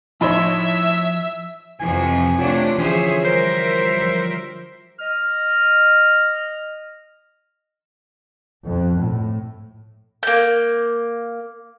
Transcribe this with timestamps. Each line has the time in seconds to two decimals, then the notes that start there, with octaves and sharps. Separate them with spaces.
0.21 A2 F3 D#4 C#5 E5 B5 C6
1.80 F2 C3 E3 F3 E4 B4 G#5
2.38 C3 A3 D4 F4 C#5 F#5
2.78 D3 E3 F3 C#4 G#4 C5 E5
3.24 G3 A#4 C5 E5
3.98 F3 F#3
5.00 D#5 F6
8.64 F2
9.00 A2
10.23 A#3 G6